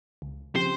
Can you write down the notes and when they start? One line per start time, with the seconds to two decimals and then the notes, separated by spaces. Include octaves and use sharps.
0.22 C#2
0.55 C#3 F3 C4 G4 C5